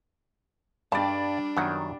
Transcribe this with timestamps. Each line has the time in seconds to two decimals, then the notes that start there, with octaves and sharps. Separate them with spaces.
0.92 G2 G3 G#3 D4 D5 A5
1.57 F#2 D#3 F#3 B3 E4 F#5